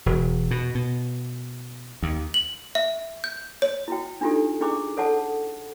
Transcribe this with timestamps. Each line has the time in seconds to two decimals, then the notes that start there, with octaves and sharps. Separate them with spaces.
0.06 E1
0.51 B2
0.75 B2
2.03 D#2
2.34 F#7
2.75 E5
3.24 G6
3.62 C#5
3.88 E4 F#4 G5
4.21 D4 D#4 F4 G4 A4
4.60 C#4 D4 E4 G#4 C#6 D6
4.97 A4 C#5 F#5 A5